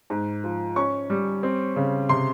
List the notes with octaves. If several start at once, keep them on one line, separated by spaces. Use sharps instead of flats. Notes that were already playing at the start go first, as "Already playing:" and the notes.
G#2
F3
C#4 C#6
G3
C4
C#3
C3 C6